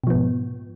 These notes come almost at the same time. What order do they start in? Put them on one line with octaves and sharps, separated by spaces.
B2 F3 B3 G#2